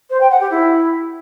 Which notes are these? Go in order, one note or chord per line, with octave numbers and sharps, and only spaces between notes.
C5
G5
F#5
G4
E4